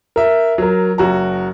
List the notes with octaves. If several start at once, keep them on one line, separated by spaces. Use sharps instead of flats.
A#4 E5
F#3 A#4
F#1 F#4 A#5